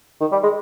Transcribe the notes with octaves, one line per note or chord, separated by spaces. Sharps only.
D#3
G3
G#3